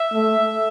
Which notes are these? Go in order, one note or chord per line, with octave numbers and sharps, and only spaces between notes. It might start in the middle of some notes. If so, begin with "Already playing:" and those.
Already playing: E5
A3